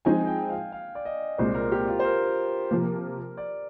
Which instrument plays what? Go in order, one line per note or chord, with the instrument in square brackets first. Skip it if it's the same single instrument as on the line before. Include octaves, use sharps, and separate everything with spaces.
[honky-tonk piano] F3 G#3 C4 D#4 G#4 [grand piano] G#5
[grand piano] G5
F5
F5
D5
D#5
[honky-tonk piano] C2 A#2 G#3 [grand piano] C5
[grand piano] A#4
G4
F4
C5
A#4
[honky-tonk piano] C3 F3 A#3
[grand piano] D5